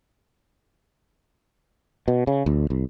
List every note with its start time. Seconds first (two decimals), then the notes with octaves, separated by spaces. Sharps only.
2.08 B2
2.27 C#3
2.46 D2
2.70 C2